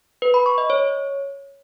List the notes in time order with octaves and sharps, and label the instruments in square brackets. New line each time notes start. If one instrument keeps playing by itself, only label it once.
[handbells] B4
B5
C#6
D#5
C#5